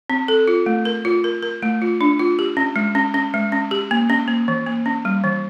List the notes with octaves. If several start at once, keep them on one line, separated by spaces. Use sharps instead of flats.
C4
A4
F4
A3
A#4
F4
A#4
A#4
A3
F4
D4
F4
G4
C#4
G#3
C#4
C#4
G#3
C#4
G4
A#3
C#4
A#3
E3
A#3
C#4
G3
E3